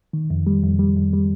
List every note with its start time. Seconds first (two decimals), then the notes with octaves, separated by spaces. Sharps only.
0.13 D#3
0.30 F2
0.47 G3
0.64 F2
0.79 G3
0.97 F2
1.13 G3